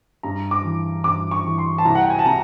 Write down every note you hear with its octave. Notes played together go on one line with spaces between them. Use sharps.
G2 A#5
D6
E3
G2 D6
C#6
E3
C6
A5
C2 A#5
F#5
G5
G#5
A5
C3 A#5